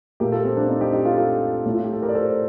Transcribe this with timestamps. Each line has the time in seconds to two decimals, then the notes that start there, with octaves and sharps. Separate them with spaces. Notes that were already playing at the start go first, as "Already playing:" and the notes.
0.20 A#2 A3 G4 A#4
0.32 F4 A4
0.45 C4
0.57 D4
0.69 C4 D#4
0.81 D#4 G4
0.93 D#4 G4
1.05 F4 A4
1.17 F4 A4
1.66 A2 A3
1.74 F4
1.84 G4
1.93 A4
2.02 G4 A#4
2.09 D5
2.15 A4 C5